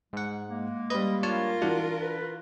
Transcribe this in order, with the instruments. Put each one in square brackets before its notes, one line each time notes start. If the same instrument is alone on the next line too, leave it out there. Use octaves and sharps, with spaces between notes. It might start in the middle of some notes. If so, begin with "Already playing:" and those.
[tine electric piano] G#2 F#5 [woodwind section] G#3
[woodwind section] G#3 A#3
[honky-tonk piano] G3 B4 [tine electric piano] D#5
[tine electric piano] D4 C#5 A5 [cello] F4 A#4
[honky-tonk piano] E3 F#4 [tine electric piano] D4
[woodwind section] B4